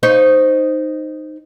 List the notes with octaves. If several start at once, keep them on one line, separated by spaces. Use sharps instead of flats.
D#4 C5 C#5